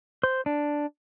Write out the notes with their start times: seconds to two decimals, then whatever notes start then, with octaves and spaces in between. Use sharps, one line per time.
0.23 C5
0.46 D4